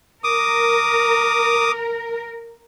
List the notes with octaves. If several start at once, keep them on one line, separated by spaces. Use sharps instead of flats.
A#4 D6 D#6